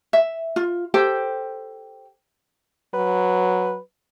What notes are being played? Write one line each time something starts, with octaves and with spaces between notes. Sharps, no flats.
E5
F4
G4 A4 C5 G5
F#3 B4